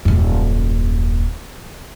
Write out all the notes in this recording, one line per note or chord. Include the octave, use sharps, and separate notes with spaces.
D#1 F#2